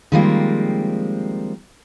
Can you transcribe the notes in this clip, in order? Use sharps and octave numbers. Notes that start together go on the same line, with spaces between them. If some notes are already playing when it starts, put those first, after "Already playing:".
D#3 F3 G3 G#3 A#3 C4